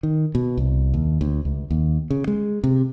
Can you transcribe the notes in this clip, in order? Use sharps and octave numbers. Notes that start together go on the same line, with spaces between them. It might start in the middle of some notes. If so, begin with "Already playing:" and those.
D#3
B2
C2
D#2
D2
C#2
D#2
C#3
G#3
C3